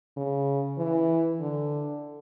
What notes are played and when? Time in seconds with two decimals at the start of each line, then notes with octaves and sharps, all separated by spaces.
0.17 C#3
0.78 E3
1.40 D3